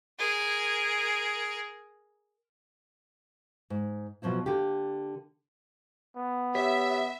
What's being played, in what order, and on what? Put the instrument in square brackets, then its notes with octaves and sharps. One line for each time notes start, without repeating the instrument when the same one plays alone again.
[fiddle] G#4 A#4
[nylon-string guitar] G#2
B2 F3 F#3 C4 E4
D3 A#3 G4
[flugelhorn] B3
[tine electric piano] G4 C#5 B6 [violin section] E5